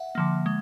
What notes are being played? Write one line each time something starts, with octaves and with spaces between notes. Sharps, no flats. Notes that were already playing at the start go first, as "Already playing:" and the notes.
Already playing: E5 F#5
D3 F3 A#3
G#3